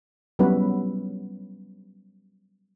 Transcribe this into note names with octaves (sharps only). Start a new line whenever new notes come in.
F#3 G3 B3 C#4 E4 B4